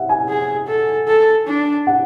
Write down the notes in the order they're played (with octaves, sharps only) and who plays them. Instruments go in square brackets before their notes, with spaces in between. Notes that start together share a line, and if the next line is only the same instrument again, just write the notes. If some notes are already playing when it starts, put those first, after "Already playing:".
Already playing: [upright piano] E5 F#5
G#5
[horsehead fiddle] G#4
A4
A4
D4
[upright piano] F#5